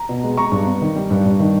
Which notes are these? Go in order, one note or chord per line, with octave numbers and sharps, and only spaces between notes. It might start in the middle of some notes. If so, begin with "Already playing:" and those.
Already playing: A#5
B2
G#3
G#3 A#5 C#6
G2
B3
D#3
G3
G2
G2
D#3